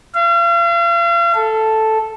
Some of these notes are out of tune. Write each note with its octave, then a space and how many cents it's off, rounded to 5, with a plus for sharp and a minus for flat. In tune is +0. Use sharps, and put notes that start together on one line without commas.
F5 -40
A4 +0